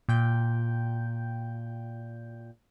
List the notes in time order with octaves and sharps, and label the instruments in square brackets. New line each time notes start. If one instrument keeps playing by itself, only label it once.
[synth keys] A#2 G5 G6